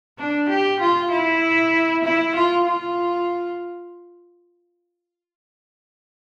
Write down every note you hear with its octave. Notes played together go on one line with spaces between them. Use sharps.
D4
G4
F4
E4
E4
F4
F4